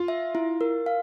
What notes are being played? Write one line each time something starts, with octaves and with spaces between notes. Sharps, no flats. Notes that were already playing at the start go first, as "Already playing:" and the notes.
Already playing: F4
E5
E4
A#4
F5